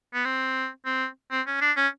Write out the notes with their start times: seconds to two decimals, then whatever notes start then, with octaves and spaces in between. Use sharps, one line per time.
0.14 B3
0.25 C4
0.85 C4
1.31 C4
1.46 C#4
1.61 D4
1.76 C#4